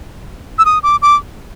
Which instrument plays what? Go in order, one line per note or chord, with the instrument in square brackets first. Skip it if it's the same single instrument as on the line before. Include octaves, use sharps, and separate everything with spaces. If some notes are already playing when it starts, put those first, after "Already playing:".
[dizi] E6
D#6
D6
D6